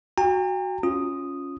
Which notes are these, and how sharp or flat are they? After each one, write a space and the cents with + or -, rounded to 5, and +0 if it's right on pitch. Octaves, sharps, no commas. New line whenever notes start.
F#4 +0 G5 +45 A#5 -45
C#4 +0 F4 +10 D#6 -5